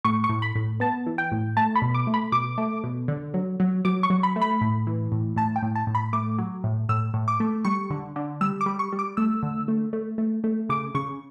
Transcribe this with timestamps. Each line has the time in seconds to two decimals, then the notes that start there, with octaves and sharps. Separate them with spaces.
0.05 A2 C#6
0.24 C#6
0.29 A2
0.42 B5
0.55 A2
0.80 B3 A5
1.06 E3
1.18 G5
1.32 A2
1.57 A3 A5
1.76 B5
1.82 B2
1.95 D6
2.07 A3
2.14 B5
2.32 B2 D6
2.58 A3
2.84 B2
3.08 D3
3.34 F#3
3.60 F#3
3.85 F#3 D6
4.03 C#6
4.10 F#3
4.23 B5
4.36 A3
4.41 B5
4.61 A2
4.87 E3
5.12 A2
5.36 A2 A5
5.56 G5
5.62 A2
5.75 A5
5.87 A2
5.95 B5
6.13 A3 D6
6.38 F#3
6.64 A2
6.89 A2 E6
7.14 A2
7.28 D6
7.40 A3
7.65 G3 C#6
7.90 D3
8.16 D3
8.41 G3 E6
8.61 D6
8.66 G3
8.79 C#6
8.92 G3
8.99 D6
9.17 A3 E6
9.43 D3
9.68 A3
9.93 A3
10.18 A3
10.44 A3
10.69 C#3 D6
10.95 C#3 C#6